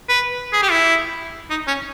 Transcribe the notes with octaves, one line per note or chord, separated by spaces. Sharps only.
B4
G#4
G4
E4
D#4
C#4